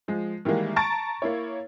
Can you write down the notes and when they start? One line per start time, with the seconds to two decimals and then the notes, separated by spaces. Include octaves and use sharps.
0.08 F3 G#3
0.45 D#3 E3 G3 G#3 A#3
0.76 A5 A#5 C#6 A6 D7
1.22 A#3 E4 C#5